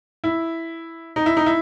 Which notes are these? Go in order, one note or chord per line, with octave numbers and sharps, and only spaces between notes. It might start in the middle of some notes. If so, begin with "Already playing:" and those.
E4
D#4
E4
D#4
E4